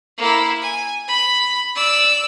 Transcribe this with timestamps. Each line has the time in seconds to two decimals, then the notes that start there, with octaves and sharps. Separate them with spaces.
0.18 A#3 E4
0.61 G#5
1.08 B5
1.75 D5 E6